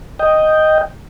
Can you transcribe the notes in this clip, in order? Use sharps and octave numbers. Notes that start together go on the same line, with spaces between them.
D#5 G5